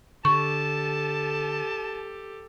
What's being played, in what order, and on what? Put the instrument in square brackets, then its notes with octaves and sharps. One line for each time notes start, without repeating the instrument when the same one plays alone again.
[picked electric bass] D3 [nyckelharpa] G4 A4 [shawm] A5 [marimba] C#6